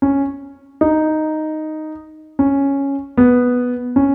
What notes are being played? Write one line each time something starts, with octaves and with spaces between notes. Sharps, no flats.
C#4
D#4
C#4
B3
C#4